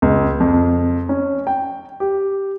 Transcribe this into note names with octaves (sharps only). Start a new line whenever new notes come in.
C#2
F2
C#4
G5
G4